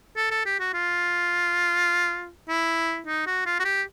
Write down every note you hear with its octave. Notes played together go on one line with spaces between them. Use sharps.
A4
A4
G4
F#4
F4
E4
D#4
F#4
F4
F#4
G4